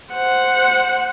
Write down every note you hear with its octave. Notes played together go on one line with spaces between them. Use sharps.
C5 F#5